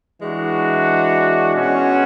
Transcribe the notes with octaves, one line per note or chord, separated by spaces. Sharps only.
E3 G#3 D4 F#4
B2 G#3 C#4 F#4